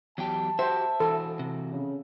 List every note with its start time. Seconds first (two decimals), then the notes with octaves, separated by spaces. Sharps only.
0.18 E2 F#3 G4 G5 A5
0.59 F#4 G4 C5 E5
1.00 E3 F#4 A4
1.39 C3
1.70 C#3